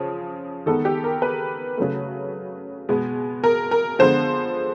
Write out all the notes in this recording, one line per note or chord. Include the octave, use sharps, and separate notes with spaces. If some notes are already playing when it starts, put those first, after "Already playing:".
Already playing: C#3 F3
D#3 G#3 B3 A4
G4
A#4
B4
C#3 F#3 A3
B2 G#3 B3
A#4
A#4
D3 F3 G#3 B3 C5